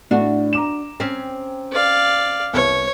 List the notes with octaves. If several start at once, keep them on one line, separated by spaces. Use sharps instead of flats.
A2 D4 F#4
A#5 D6 E7
C4 C#4
D5 F5
C2 B3 C#5